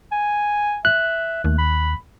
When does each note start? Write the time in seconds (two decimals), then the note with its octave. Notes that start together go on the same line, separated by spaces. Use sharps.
0.12 G#5
0.85 E5 F#6
1.44 D#2 A3
1.59 B5